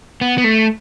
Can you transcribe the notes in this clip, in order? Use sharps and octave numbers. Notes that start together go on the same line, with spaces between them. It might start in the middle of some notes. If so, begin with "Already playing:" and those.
B3
B3
A3